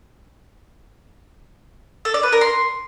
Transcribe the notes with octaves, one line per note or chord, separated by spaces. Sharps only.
A4
D5
B4
A#4
C6